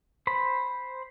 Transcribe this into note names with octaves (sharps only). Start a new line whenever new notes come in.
C5 B5